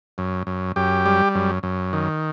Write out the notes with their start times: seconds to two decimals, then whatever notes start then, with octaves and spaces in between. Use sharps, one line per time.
0.18 F#2
0.47 F#2
0.76 F#2 G4
1.06 G3
1.35 F#2
1.63 F#2
1.93 D#3